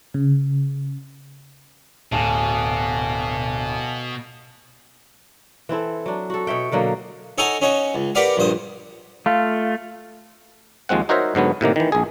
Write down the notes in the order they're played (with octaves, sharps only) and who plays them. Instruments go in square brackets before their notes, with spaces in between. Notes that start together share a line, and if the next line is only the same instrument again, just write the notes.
[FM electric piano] C#3
[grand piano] D1 [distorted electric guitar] B2 [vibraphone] F5 G#5 A5
[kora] E3 C4 E4 A4
F#3 D4
F#4 A4
B2 C#5 E5 G5
B2 D3 F#3 A#3
[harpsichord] D#4 A4 C#5 F#5 G#5 A#5
C#4 D#4 F#4 C#5
C#2
G4 A#4 B4 D5 F5 F#5
A#1 G2 C5 D#6
[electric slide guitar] A3 F4 [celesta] F5
[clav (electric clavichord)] D#2 F3 G#3 C4 F#5
D#4 F#4 A#4 C5 C#5 E5
G#2 D3 F#3 B3
A2 C3 D#3 A#3
D#3 E3
A#1 G#4